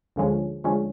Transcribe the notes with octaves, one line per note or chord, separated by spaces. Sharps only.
D2 D3 F3 G#3 C#4
D2 D3 F3 G#3 C#4